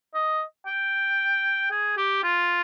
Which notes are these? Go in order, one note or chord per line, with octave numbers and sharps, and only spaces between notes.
D#5
G5
G#4
G4
F4